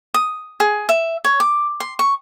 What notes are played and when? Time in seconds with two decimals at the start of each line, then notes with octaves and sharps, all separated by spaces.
0.14 D#6
0.60 G#4
0.89 E5
1.25 C#5
1.40 D6
1.80 C6
1.99 C#6